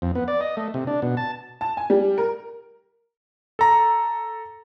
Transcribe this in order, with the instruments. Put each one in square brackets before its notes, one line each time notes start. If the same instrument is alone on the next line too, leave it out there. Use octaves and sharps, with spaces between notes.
[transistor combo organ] F2
B3
D5
D#5
A3
C3
D4
B2
A5
[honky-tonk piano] A5
G#5
G3
A#4
[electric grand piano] A4 A#5